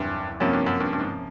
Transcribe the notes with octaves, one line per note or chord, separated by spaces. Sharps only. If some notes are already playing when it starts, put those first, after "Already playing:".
Already playing: F#1 E2 G2 C3
F#2 C3 F3 A#3 C#4
G2
F#2
G2
G2
G#2